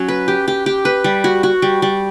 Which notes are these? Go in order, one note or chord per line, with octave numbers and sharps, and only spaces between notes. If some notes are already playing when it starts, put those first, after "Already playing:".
Already playing: F#3 C#4
B4
G4
G4
G4
B4
G3
F#4
F#4
G3
G3